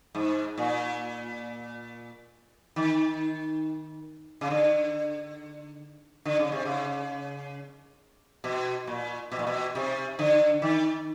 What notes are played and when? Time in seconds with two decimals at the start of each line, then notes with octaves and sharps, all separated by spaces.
0.15 G#2
0.58 A#2
2.76 D#3
4.41 C#3
4.50 D3
6.25 D3
6.39 C#3
6.52 C3
6.65 C#3
8.44 B2
8.87 A#2
9.32 B2
9.39 A#2
9.47 B2
9.75 C3
10.19 D3
10.62 D#3